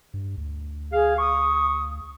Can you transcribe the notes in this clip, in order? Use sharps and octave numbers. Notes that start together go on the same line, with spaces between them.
G2
D2
G#4 F5
C#6 D#6